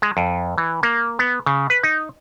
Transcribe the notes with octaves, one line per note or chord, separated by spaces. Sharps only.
G#3
F2
E3
A#3
B3
C#3
B4
D#4